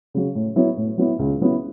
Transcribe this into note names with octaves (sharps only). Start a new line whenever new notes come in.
C#3 F#3
A2
F#3 B3 E4
A2
F#3 B3 E4
C#2
C#3 F#3 B3 E4